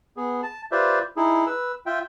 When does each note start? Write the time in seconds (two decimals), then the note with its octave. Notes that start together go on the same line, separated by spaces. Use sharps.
0.17 B3 G#4
0.43 A5
0.72 F4 G4 B4 C5 D5 E5
1.17 D#4 E4 G#4
1.46 B4 E6
1.86 F4 E5 G5